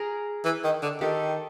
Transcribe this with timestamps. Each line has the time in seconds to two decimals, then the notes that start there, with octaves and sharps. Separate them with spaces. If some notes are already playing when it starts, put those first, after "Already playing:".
Already playing: G#4 A#4
0.45 E3
0.64 D#3
0.82 D3
1.01 D#3 G4 A4